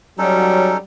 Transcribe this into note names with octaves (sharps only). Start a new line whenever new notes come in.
F#3 G3 C#4 D#4 A4